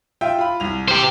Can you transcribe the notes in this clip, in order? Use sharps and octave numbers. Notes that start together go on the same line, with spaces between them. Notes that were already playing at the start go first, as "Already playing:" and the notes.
F4 E5 G5
F4 B5
C2 F7
G4 C5